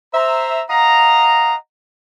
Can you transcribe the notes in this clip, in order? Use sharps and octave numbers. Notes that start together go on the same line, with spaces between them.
C5 E5 A#5
D#5 F5 F#5 A#5